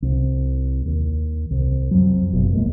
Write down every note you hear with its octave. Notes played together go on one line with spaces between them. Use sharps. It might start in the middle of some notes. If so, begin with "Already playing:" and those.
C2
D#2
C2
F2 F#3
F#1 F2 B2
E1 B1 G#3 A#3